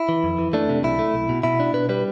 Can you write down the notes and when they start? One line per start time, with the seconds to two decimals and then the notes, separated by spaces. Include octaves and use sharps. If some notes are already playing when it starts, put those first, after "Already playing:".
Already playing: E4
0.09 E3
0.24 F2
0.38 E3
0.53 A3 D4
0.69 C3
0.84 B1 E4
0.99 A3
1.14 B1
1.29 B2
1.43 B2 E4
1.60 D4
1.73 B2 B4
1.89 G3 B4